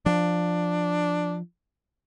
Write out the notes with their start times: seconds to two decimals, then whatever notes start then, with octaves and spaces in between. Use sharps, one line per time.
0.06 F3 D4